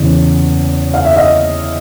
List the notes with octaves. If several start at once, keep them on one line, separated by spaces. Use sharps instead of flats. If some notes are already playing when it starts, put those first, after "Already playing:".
Already playing: E2 C#3 E3
F5
E5
D#5 F5